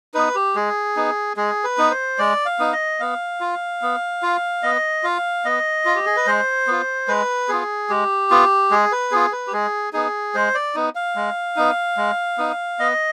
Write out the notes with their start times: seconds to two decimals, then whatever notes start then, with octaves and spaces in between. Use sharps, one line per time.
0.14 B3 D#4 B4
0.35 G4
0.55 G#3 G#4
0.96 B3 D#4
1.36 G#3 G#4
1.64 B4
1.78 B3 D#4
1.91 C5
2.18 G#3 D5
2.46 F5
2.59 B3 D#4
2.73 D#5
3.00 B3 F5
3.41 F4
3.82 B3
4.23 F4
4.63 B3 D#5
5.03 F4 F5
5.45 B3 D#5
5.85 F4
5.95 G4
6.06 G#4
6.16 B4
6.27 G#3 C5
6.67 B3 F4
7.08 G#3 B4
7.49 B3 F4 G#4
7.89 G#3 G4
8.31 B3 F4
8.71 G#3 G#4
8.92 B4
9.11 B3 F4 G#4
9.32 B4
9.47 G4
9.52 G#3 G#4
9.93 B3 D#4 G#4
10.35 G#3 C5
10.54 D5
10.75 B3 D#4
10.95 F5
11.16 G#3
11.56 B3 D#4
11.97 G#3
12.38 B3 D#4
12.79 B3 D#5